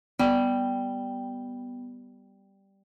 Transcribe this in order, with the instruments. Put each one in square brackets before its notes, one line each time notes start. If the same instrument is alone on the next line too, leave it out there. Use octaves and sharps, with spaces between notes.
[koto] G3 [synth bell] B3 G5